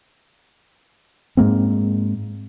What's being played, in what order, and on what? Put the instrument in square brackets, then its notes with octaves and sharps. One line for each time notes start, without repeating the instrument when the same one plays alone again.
[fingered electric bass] G#2 G#3 A#3 C4